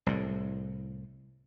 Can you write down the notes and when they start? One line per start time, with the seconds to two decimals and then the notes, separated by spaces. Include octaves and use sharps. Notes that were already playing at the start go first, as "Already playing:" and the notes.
0.06 C2 A2